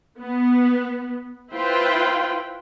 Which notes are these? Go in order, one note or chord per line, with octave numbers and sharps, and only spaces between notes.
B3
E4 F4 B4 C5 G5 C6